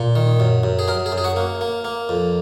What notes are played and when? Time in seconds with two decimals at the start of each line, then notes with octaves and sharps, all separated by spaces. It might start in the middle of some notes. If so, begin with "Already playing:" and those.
Already playing: A#2
0.16 D#3
0.40 F#2
0.64 F#2
0.79 G#4
0.88 F#2 A#4
1.06 G#4
1.12 F#2
1.18 G#4
1.24 F#4
1.36 A#3
1.61 A#3
1.84 A#3
2.09 F2